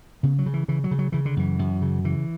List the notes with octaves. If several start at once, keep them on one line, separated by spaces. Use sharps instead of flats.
C#3 B3
F#3
C#3
E3
C#3 E3
F#3
C#3
F#3
C#3 E3
D3
F#2 E3
F#2
C#3
C#3 E3